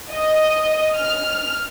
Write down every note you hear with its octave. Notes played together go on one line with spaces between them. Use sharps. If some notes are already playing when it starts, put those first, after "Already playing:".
D#5
F6